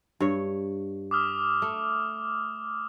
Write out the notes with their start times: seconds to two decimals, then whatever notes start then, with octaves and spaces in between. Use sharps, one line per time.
0.20 G2 C#5
1.11 D6 D#6 F6
1.62 A3